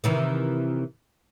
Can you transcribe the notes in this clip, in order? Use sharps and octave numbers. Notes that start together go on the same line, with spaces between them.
C3 D#3 E3